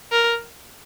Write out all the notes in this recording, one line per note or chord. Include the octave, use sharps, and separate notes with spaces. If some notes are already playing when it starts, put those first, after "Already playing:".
A#4